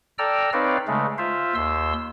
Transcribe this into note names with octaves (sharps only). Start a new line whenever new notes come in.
A4 D5 G5 A#5 E6 F6
C4 D#4 B4 C#5 D5 F5
C#3 G#3 A3
F4 C5 E5 F5
D#2 C6 E6